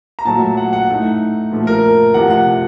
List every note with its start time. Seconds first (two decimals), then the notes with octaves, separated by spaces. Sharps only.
0.19 A#5
0.25 A#2 F#3 A3 A5
0.57 F#5
0.73 F#5
0.88 A2 A3 D#4
1.51 A#2 F3 A3
1.67 A#4
2.14 C3 F3 A3 F#5
2.30 F#5